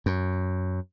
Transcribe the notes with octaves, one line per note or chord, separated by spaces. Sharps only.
F#2